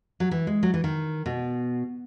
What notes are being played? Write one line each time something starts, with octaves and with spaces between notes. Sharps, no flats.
F#3
E3
G#3
F#3
E3
D#3
B2